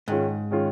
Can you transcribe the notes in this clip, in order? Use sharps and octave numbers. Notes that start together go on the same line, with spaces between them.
G#2 D#3 G#3 C#4 F4
D#3 G#3 C#4 F4